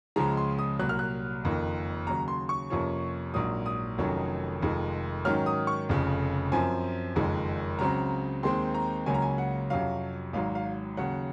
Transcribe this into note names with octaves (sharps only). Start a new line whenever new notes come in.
C#2 C#3 F3 G#3 A#5
C6
D#6
C2 A#2 F#3 F#6
F6
F#6
F#1 F2 D#3 A#3
D#2 C#3 F#3 A#5
C6
C#6
F2 C3 F3 A#3 C#4
A#1 G#2 F#3 A#3 D#6
D#6
F1 F2 D#3 F#3 C#4
F1 F2 D#3 G#3
G#2 D#3 F#3 C#4 F6
D#6
C#6
F1 F2 C#3
F#2 F3 C4 G#5
F#1 F2 D#3 G#3
C#2 C#3 F#3 C4 A#5
D#2 D#3 G#3 C4 C6
A#5
C#2 C#3 F#3 A#3 C#4 G#5
A#5
G#5
F#5
F2 C3 F#3 C#4 F5
G#1 G#2 F#3 F5
F5
D#2 C#3 F#3 F#5